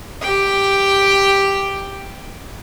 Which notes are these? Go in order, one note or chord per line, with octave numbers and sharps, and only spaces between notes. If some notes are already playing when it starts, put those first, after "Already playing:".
G4 G5